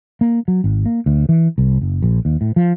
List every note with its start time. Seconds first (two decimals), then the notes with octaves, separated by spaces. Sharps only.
0.21 A#3
0.48 F#3
0.64 G#1
0.86 A#3
1.06 D2
1.29 E3
1.58 C2
1.81 F#1
2.02 A#1
2.25 D#2
2.41 A2
2.56 F3